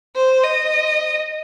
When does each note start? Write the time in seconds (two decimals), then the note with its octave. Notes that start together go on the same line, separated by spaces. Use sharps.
0.16 C5
0.43 D#5